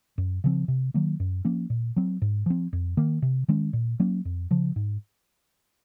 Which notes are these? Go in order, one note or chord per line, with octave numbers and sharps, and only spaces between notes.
F#2
C#3 F3 C4
C3
D#3 F#3 A#3
F#2
F3 A#3 C#4
A#2
F#3 C4
G#2
F3 C4
F2
D#3 A#3
C3
D#3 G#3 C#4
A#2
F#3 A#3 C#4
F2
C#3 F3
G#2